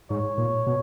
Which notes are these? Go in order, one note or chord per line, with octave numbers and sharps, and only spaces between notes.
G#2 C#5
A#2
B2